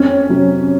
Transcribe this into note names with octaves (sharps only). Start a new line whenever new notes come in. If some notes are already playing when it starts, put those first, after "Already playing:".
Already playing: F2 C#4
C3 F#3